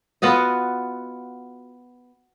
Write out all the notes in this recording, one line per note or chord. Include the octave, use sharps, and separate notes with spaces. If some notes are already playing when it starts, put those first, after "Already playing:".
B3 F4 F#4 D#5